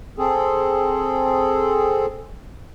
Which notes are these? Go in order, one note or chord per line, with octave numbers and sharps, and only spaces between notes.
C4 G#4 A4